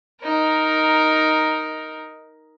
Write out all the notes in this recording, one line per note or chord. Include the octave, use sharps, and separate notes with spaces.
D#4 A#4